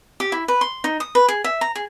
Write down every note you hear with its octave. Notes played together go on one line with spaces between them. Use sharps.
G4
E4
B4
C6
D#4
D#6
B4
G#4
E5
A#5
G#4